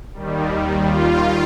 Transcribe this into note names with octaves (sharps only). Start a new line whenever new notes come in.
D#2 D#3 G3
F4